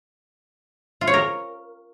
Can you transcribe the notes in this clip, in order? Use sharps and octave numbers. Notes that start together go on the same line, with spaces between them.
F4
C#5
A#4